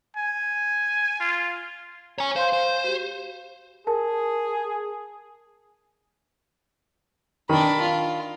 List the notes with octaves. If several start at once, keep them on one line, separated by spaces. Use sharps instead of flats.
G#5
F4
C#5 G#5 A#5
C5 F5 C6 G6
C5
F#4 G4
G#4 A#4 A5
D#3 D4 B5
F4